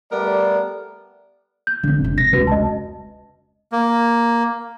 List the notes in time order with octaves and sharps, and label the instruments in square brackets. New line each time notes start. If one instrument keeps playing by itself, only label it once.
[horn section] G3 A3 B3 A#4 D5
[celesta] G6
[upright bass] D3 C4
F#1 C3
[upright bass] C3 [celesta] A#6
[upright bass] F1 C#2 [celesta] F#4 B4
[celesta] D#5 A5
[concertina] A#3